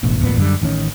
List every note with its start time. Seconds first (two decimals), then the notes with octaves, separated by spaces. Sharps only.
0.03 E1 A1 E2
0.21 D1 A1 A#2 B3
0.37 F#2 D3 G3
0.62 A1 D#3 F#3 C#4